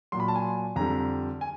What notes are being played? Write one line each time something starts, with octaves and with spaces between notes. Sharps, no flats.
A#2 F#3 C6
B5
A5
G#5
F2 D3 G3 A#5
G#5